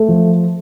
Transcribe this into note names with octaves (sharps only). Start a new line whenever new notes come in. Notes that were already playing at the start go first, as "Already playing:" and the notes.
Already playing: A3
F3